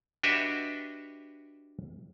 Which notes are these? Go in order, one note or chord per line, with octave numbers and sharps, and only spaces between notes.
D4 F#4 G4 B4 D#5 E5